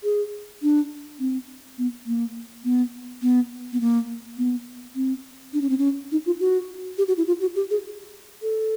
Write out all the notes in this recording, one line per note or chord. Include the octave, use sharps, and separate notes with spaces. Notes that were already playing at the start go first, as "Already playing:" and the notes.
G#4
D4
C4
B3
A#3
B3
B3
B3
A#3
B3
C4
D4
C#4
C4
C#4
D#4
F4
F#4
G4
F#4
E4
F4
F#4
G4
G#4
A4